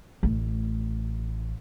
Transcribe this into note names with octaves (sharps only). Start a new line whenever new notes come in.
A1 A3